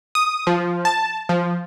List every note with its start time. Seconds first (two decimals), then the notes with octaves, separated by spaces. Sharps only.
0.15 D#6
0.47 F3
0.85 A5
1.29 F3